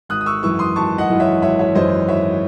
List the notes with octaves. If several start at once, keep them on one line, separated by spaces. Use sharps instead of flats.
G#1 D#6 F#6
D#6
C#6 E6
F#2 E3 C#6 E6
C6 D#6
G#1 A5 C#6
D#5 F#5
F#2 E3
C#5 E5
G#1 C#5 E5
C#5 E5
F#2 E3 C5 D#5
G#1 C#5 E5